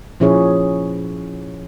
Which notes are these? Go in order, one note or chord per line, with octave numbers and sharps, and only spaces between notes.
A#2 F3 C#4 E4 G#4 C#5